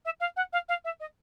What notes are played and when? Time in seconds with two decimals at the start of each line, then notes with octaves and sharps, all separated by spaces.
0.05 E5
0.20 F5
0.36 F#5
0.53 F5
0.68 F5
0.84 E5
1.00 D#5